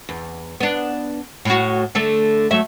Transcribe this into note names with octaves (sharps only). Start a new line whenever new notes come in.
E2
B3 D4
A2 F#4
D3 A3 A4
F#3 A3 E5